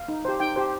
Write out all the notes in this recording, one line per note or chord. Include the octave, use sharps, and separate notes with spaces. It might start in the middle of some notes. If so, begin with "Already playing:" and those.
Already playing: F5
D#4
G4 C5
D#4 G5
G4 C5